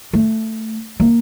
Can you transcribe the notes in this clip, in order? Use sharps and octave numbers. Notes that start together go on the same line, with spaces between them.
A3
A#3